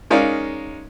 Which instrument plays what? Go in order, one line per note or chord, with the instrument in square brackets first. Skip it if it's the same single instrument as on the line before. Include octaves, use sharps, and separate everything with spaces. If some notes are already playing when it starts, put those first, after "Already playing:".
[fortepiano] G#3 C#4 D#4 A#4 D5 F5